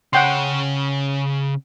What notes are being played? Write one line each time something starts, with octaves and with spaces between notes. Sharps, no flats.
C#3 C#5 F#5 G5 C6